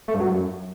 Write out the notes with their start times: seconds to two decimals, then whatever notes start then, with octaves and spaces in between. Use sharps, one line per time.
0.08 A3
0.14 G2
0.20 F#3
0.26 F#2